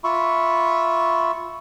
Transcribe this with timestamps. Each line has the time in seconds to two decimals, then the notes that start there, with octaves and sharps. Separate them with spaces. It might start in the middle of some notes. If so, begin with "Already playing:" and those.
0.04 F4 E5 B5 C#6